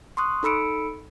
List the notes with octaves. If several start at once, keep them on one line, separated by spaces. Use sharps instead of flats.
C6 C#6 D#6 F#6
D#4 A4 B5 E6 C#7 D7